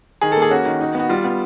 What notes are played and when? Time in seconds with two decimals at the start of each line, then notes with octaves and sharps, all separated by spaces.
0.21 D#3 G#4
0.32 A4
0.37 A#3
0.42 G#4
0.51 C#4 F#4
0.66 D#3
0.81 D#4
0.95 B3 F#4
1.09 G3 F4
1.24 B3